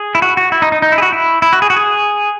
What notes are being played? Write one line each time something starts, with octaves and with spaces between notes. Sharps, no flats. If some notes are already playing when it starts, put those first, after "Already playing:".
Already playing: G#4
E4
F#4
F#4
E4
D#4
D#4
D#4
E4
G#4
F#4
E4
E4
F#4
G#4
F#4
G#4